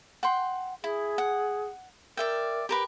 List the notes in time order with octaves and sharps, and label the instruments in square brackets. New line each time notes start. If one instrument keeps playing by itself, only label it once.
[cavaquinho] F#5 G5 C6
[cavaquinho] E4 [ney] G#4
[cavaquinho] F#5
[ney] A#4 [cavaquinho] D5 E5 G5
[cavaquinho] G4 A#4 B4